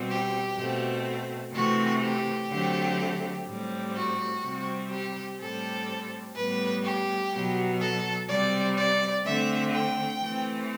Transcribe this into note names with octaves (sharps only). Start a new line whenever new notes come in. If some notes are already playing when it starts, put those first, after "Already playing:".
Already playing: B2 G3 C4
G4
B2 A3 C4
C3 E3 A3 C4 F#4
G4
D3 F#3 A3 C4
A2 G3 C4
F#4
C3 G3 C4
G4
A2 G3 C4 A4
A2 G3 B3 B4
G4
B2 F#3 B3
A4
C3 G3 C4 D5
D5
D3 A3 C4 E5
G5
E3 A3 C4